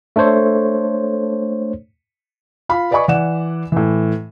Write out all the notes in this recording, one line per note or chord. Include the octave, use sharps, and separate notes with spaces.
A3 D4 A4 C5 C#5
F4 F5 B5
B4 D5 D#5 G#5 B5 C#6
E3 D5 F#5 E7
A2 E3